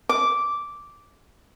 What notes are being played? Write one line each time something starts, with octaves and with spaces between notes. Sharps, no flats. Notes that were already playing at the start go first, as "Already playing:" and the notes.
D6